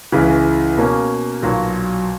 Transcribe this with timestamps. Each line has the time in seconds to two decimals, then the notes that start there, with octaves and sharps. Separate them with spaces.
0.12 C#2 C#3 E3
0.77 B2 A#3 C#4
1.43 B1 A#2 F#3